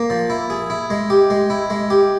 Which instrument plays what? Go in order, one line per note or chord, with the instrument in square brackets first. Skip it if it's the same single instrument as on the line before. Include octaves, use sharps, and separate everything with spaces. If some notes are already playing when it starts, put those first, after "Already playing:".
Already playing: [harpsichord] A#3
F3
E4
G#4
E4
G#3
G4
G#3
E4
G#3
G4